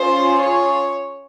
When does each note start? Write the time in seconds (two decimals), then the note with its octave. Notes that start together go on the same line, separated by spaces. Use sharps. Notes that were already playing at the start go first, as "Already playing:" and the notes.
Already playing: C#4 F4 G#4 C5
0.39 C#5